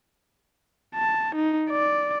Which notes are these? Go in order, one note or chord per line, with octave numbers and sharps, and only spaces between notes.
A5
D#4
D5